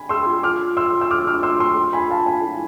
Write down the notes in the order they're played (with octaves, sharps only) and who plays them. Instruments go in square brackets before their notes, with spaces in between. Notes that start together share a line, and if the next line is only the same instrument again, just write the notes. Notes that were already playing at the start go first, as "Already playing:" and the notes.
Already playing: [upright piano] G#5 B5
[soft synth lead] G#4 [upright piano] C6 E6
[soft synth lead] G#4
F4
[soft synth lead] F4 [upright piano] D6 F6
[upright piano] C6 E6
E6
D6 F6
D6 F6
C6 E6
C6 E6
G#5 B5
F5 A5
G#5 B5
[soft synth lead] E4